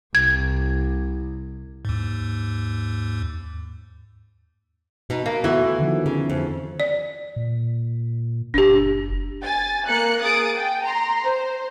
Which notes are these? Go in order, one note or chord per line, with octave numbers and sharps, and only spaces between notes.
C2 G#6
D#2 G#2
B2 D#4
B2 A#3
E3 A3 B3 F#4
D3 D#3 F3
C#3
F2
D5
A#2
F#1 D4 G4
G#5 A6
A#3 F#6 C#7
A#3 G#4 D#6 A6 D7
G5
A#5 C6
C5